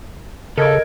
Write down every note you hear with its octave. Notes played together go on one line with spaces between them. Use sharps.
C#3 A4 A#4 D#5 G#6 D7